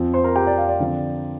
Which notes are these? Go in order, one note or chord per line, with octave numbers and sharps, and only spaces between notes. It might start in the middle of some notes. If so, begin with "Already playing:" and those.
Already playing: F2 F3 C4
C5 C6
A#4 A#5
G4 G5
D5
F5
D5
D3 F3 C4 F4